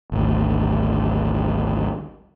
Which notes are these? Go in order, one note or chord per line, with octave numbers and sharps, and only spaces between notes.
G#1 D2